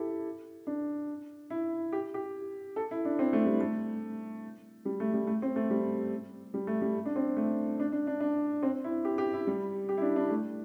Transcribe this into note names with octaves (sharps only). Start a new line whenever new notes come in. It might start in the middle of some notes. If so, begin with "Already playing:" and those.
Already playing: E4 G4 A4
D4
E4
G4
G4
A4
E4
D4
C4
A3
G3
A3
G3
A3
G3
A3
C4
A3
G3
G3
A3
G3
D4
C4
A3
D4
D4
D4
D4
C4
E4
G4
G4
E4
G3
G4
E4
D4
D4
A3